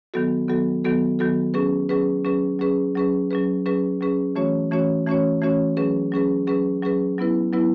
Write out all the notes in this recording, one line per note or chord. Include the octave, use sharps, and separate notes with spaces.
D#3 F#3 B3 F#4 A4
D#3 F#3 B3 F#4 A4
D#3 F#3 B3 F#4 A4
D#3 F#3 B3 F#4 A4
F#3 C#4 G#4 B4
F#3 C#4 G#4 B4
F#3 C#4 G#4 B4
F#3 C#4 G#4 B4
F#3 C#4 G#4 B4
F#3 C#4 G#4 B4
F#3 C#4 G#4 B4
F#3 C#4 G#4 B4
E3 A3 C#4 F#4 C#5
E3 A3 C#4 F#4 C#5
E3 A3 C#4 F#4 C#5
E3 A3 C#4 F#4 C#5
F#3 C#4 G#4 B4
F#3 C#4 G#4 B4
F#3 C#4 G#4 B4
F#3 C#4 G#4 B4
F#3 B3 E4 B4
F#3 B3 E4 B4